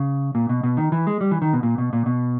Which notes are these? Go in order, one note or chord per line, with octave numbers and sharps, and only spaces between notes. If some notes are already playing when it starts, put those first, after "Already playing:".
Already playing: C#3
A#2
B2
B2
D#3
E3
G#3
G3
E3
D#3
B2
A#2
B2
A#2
B2